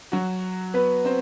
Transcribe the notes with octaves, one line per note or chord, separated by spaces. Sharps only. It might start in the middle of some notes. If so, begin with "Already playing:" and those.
F#3 F#4
B3 B4
C4 C5